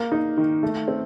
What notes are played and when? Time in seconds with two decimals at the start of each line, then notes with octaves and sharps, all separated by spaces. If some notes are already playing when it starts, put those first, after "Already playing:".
Already playing: A#3
0.12 D#4
0.37 D#3
0.63 A3
0.88 C4